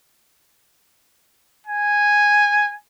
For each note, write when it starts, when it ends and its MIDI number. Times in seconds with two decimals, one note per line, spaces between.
1.66 2.75 80